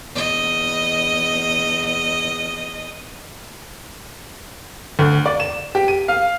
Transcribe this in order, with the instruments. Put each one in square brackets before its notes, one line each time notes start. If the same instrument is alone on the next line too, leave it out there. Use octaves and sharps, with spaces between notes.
[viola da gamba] E2 D#5
[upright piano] D2
D5
E7
G4
D#7
F5